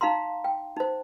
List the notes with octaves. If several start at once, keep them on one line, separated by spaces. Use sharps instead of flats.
D#4 F5 A#5 C6
G5
D#4 C5